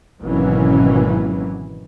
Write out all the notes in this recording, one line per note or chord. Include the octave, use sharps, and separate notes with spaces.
G#1 B2 E3 F#3 A#3 C#4